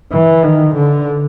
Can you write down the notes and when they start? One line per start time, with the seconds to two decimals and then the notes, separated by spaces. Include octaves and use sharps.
0.12 E3
0.43 D#3
0.76 D3